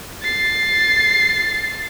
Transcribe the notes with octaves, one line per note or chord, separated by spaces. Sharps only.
A6 C7